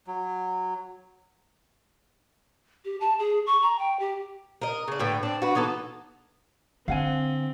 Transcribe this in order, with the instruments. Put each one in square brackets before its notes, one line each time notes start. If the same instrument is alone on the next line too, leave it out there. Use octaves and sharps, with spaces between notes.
[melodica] F#3
[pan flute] G4
A5
G#4
C#6
A#5
G5
G4
[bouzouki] A#4 D#5
C#3 D4
A2 D3 B4 G5
C4 D4
F#4 B4
E3 B3 D#4 A4
[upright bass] D3 [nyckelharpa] C4 [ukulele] F5 F#5 G#5